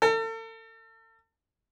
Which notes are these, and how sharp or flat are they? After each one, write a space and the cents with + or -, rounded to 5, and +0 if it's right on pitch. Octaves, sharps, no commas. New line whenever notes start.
A4 +40